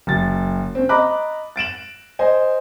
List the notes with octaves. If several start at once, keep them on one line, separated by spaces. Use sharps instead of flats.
F#1 A6
C4 C#4
D#5 A#5 B5 D6 F#6
A6 D7 E7 F#7
C5 D#5 G#5